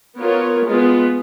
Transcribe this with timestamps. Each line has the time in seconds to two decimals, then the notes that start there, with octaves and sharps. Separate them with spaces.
0.19 B3 F4 A#4 C#5
0.65 G#3 B3 F4